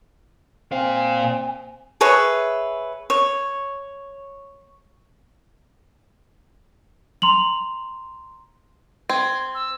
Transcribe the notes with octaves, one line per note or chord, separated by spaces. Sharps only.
A#2 C4 F5 G#5
G#4 B4 C#5 E5
C#5
A#5 C6 F7 F#7
C4 G#6
E6